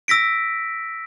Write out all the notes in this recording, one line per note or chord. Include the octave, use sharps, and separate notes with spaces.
E6 A#6 B6 D7